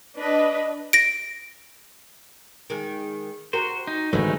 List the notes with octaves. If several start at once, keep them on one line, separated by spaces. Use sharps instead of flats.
D4 B4 D#5
A#6 D7
D#3 G#3
F#4 G4 A#4 C5
D#4
G#1 D3 F#3 G#3 A3 D#4 F#4 B4